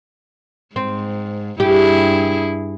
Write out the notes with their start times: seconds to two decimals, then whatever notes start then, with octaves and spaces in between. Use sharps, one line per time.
0.76 G#2 C4
1.60 G2 E4 G4 G#4